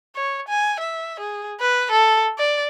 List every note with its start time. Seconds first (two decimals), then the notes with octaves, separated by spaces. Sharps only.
0.15 C#5
0.48 G#5
0.80 E5
1.20 G#4
1.61 B4
1.92 A4
2.38 D5